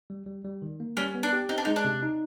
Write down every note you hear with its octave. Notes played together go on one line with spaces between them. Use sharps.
G3
G3
G3
D#3
A#3
G3 C#4
B3
D4
G4
C4 D#4
D4
G#3 D#4
D4
C3
D#4